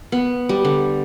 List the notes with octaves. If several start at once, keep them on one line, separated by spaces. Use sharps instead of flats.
B3
G3
D3